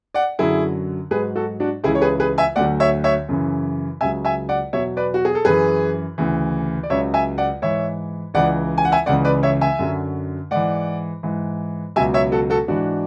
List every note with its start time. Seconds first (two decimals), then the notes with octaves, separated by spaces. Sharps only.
0.14 D5 F#5
0.39 F#2 D3 F#3 E4 G#4
1.11 G#2 F#3 G#4 B4
1.35 F#4 A4
1.60 D4 F#4
1.83 C#2 C#3 E3 E4 G#4
1.95 C#5
2.01 G#4 B4
2.20 G#4 B4
2.38 E5 G#5
2.56 D2 D3 F#3 D5 F#5
2.80 C#5 E5
3.04 C#5 E5
3.29 F#2 C#3 E3
4.01 C#2 C#3 F#3 E5 G#5
4.25 E5 G#5
4.49 D5 F#5
4.73 E2 B2 F#3 C#5 E5
4.97 B4 D5
5.14 F#4
5.25 G#4
5.35 A4
5.45 F#2 E3 G#4 B4
6.18 D2 C#3 E3
6.83 D5
6.90 C#2 C#3 F#3 C#5 E5
7.14 E5 G#5
7.38 D5 F#5
7.62 G#2 E3 C#5 E5
8.34 C#2 C#3 E3 D5 F#5
8.78 G#5
8.85 F#5
8.92 E5 G#5
9.06 C#2 C#3 E3 D5 F#5
9.25 B4 D5
9.43 C#5 E5
9.61 E5 G#5
9.79 F#2 D3 F#3
10.51 G#2 E3 D5 F#5
11.23 G#2 E3
11.96 C#2 B2 F#3 E5 G#5
12.14 C#5 E5
12.32 F#4 A4
12.50 F#4 A4
12.68 G#2 E3 D4 F#4